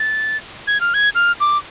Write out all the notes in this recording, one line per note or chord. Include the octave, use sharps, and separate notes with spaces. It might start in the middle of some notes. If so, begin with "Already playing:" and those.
Already playing: A6
G#6
F6
G#6
F6
D6